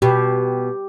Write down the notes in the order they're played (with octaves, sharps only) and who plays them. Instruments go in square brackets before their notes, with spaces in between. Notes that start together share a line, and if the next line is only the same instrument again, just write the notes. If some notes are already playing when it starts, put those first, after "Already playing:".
[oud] B2 [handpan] G4